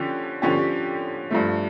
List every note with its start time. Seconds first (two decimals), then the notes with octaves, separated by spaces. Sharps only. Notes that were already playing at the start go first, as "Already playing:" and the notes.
Already playing: D3 F3 C#4 G4
0.42 D3 F3 C#4 G4
1.31 G2 F3 A3